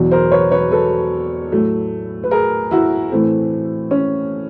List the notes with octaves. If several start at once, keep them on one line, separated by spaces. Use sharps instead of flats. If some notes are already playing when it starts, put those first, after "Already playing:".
Already playing: E2 B2 F#3
A#4 C5
B4 C#5
B4 C#5
A4 B4
A2 F#3 A3
B4
G#4 A#4
E4 F#4
A2 E3 A3 C4
C#4